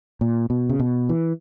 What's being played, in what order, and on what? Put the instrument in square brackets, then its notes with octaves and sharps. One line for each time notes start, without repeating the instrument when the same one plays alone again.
[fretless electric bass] A#2
B2
C#3
B2
E3